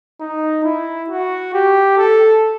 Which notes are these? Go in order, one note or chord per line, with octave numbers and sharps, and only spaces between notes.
D#4
E4
F#4
G4
A4